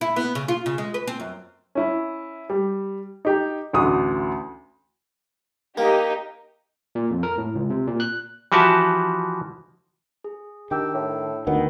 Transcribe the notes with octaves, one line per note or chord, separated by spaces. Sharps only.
E4
B3
C#3
F4
C#3
G#3
B4
C4
F#2
C#4 E4
G3
D#4 G4
A1 D2 F#4 D#6
A#3 D#4 G4 D#5
A#2
F2
A#4
A2
C#2
C3
A#2
F#6
E3 F3 F#4 G4 E5 A5
G#4
D#3 D4 G4 G5 E6
A2
D2 D#3 B3